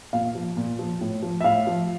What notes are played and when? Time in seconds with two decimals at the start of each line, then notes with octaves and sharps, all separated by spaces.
0.13 A#2 F5
0.35 F3
0.57 A#2
0.79 F3
1.01 A2
1.22 F3
1.41 E5
1.44 A2 F5
1.67 F3